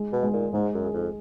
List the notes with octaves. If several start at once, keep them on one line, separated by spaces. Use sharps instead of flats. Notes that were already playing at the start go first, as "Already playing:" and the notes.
Already playing: G#3
B2
G#3
A#2
G#2 G#3
F#2
G#4
F2